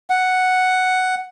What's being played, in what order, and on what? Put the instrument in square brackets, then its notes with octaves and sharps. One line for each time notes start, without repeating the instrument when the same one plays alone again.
[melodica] F#5